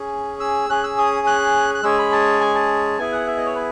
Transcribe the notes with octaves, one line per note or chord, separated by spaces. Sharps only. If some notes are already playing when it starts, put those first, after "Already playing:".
Already playing: C#4 G#4
E6
C#4 G#4 F#6
E6
D#6
F#6
F#6
G#3 C#4 G#4 E6
B5
A5
G#5
A5
B3 E4 G#4 G#5
F#5
E5
D#5
C#5
B4